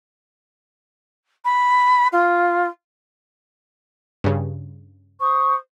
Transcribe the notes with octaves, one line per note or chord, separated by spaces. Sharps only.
B5
F4
G2 C#3
C5 C#6 D#6